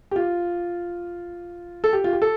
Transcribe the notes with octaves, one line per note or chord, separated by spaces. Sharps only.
G4
F4
A4
G4
F4
G4
A4